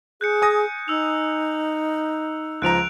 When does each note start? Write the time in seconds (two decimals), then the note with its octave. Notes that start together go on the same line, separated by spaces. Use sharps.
0.21 G#4 F#6 G6 C#7
0.42 G#5 D#6 A#6
0.88 D#4 E6 F7
2.62 C#2 F3 A#5 F#6 D7 F7